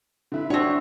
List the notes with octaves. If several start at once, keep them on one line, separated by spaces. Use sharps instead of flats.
D3 E4 F#6
C4 D4 F#4 G4 C#5 E5